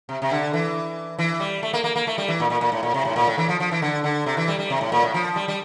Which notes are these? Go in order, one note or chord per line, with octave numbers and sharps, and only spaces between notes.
C3
C3
D3
E3
E3
G3
A3
A#3
A#3
A#3
A3
G3
E3
A#2
A#2
A#2
A2
A#2
C3
A2
A#2
A2
E3
F3
F3
E3
D3
D3
C3
E3
G3
G3
C3
A2
A#2
A2
F3
G3
G3